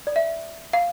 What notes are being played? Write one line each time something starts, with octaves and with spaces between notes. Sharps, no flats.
D5
E5
F5